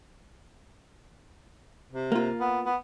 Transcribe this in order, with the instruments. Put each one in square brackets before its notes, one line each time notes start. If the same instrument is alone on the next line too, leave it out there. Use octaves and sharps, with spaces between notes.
[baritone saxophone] C3
[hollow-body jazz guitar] A#3 F4
[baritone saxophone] B3
B3